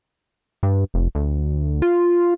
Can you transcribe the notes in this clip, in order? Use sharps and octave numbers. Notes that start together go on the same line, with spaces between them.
G2
F1
D2
F4